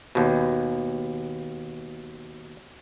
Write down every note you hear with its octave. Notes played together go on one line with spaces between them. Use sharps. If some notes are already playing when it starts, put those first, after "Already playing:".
D#2 B2